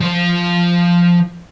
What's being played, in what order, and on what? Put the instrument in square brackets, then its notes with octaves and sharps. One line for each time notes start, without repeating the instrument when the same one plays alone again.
[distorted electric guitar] F3 C5